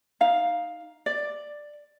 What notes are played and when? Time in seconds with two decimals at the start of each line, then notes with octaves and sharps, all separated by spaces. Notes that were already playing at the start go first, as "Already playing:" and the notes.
0.21 D#4 F5
1.06 D5